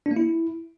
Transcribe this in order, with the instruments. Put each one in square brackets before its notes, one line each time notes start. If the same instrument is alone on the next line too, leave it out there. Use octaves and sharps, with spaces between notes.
[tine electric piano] D4
A#3
E4